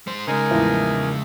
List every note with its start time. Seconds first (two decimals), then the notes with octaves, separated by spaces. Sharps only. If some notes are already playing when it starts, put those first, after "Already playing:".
0.07 G#3 C5
0.27 C#3 G#3 D#4 A#4 G#5
0.51 E2 A2 F3